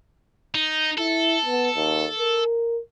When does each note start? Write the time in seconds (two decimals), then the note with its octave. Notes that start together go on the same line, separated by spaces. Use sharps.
0.55 D#4
0.98 E4 A4
1.45 B3
1.76 D#2
2.19 A#4